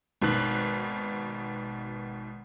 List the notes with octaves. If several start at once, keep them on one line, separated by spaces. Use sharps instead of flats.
G#1 B2 D#3 F#6